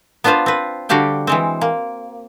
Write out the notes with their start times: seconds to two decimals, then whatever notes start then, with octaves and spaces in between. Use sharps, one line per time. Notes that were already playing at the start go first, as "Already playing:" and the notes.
0.24 B3 D4 F4 B4 C5 F5
0.46 C4 B4
0.89 D3 G3 F#4 G4 F5 G5
1.27 E3 G#3 C4
1.61 A#3